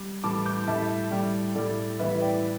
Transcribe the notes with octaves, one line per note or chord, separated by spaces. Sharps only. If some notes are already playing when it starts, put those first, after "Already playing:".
Already playing: G3
A2 E3 G3 A5 D6
D6 G6
A2 G3 E5 A5
A2 G3 D5 G5
A2 G3 A4 D5
A2 E3 G3 B4 E5
D5 G5